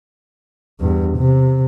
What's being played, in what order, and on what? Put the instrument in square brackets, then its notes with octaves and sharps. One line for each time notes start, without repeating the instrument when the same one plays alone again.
[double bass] E2 G2
C3